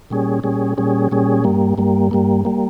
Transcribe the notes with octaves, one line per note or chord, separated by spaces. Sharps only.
A#2 G3 C#4 G#4
A#2 G3 C#4 G#4
A#2 G3 C#4 G#4
A#2 G3 C#4 G#4
G2 G3 A#3
G2 G3 A#3
G2 G3 A#3
G3 A#3